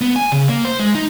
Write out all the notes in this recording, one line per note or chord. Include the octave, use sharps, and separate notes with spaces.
B3
G#5
C#3
A#3
C5
G#3
D#4